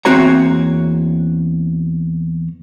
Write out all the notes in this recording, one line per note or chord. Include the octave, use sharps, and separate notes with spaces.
E2 A#3 C4 F#4 C#5 A#5